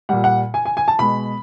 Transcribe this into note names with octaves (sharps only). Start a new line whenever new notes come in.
A#2 G3 F#5
F#5
G#5
G#5
G#5
A5
B2 G#3 B5